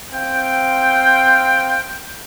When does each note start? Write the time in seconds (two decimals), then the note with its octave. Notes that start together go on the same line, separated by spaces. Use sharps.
0.13 C4 F5 G5